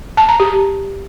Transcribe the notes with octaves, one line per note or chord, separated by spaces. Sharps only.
A5
A#5
G4